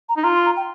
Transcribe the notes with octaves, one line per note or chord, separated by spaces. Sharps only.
A#5
D#4
F4 A#5
C6
A#5
G5